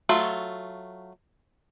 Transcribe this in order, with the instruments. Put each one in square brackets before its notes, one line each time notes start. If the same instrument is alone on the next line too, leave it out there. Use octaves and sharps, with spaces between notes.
[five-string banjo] F#3 A3 F4